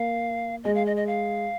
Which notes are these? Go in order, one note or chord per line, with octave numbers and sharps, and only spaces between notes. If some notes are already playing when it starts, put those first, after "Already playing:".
Already playing: A#3 F5
G#3 D#5
F5
D#5
D#5
F5